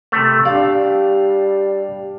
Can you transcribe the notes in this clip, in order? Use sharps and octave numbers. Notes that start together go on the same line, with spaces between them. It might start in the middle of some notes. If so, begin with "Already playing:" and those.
C3 A3
G3 D4 D5 F5